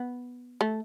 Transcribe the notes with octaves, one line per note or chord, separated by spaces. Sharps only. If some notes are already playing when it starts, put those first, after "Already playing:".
Already playing: B3
A3